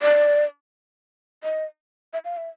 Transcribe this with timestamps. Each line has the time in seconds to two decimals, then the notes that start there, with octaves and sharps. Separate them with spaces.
0.02 D5
1.43 D#5
2.13 E5
2.25 F5
2.37 E5